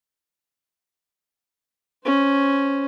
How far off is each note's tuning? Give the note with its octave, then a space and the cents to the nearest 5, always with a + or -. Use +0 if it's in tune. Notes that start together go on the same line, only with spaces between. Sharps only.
C#4 +0 C5 +0